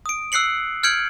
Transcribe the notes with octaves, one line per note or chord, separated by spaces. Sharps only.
D#6 D7
E6 F#6 C7 C#7 F#7
F6 G6 G#6 C#7 D7 F#7